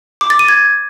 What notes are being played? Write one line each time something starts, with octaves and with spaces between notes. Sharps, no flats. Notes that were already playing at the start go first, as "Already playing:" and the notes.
D6
A6
D#7
G#6